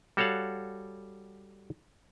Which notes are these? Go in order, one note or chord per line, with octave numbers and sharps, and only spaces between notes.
G3 F#4 A4 C#5 F5 F#5